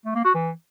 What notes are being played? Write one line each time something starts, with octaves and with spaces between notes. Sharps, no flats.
A3
A#3
F#4
E3